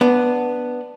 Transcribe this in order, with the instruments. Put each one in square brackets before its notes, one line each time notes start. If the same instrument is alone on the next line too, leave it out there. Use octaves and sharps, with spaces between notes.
[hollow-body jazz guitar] B3 D4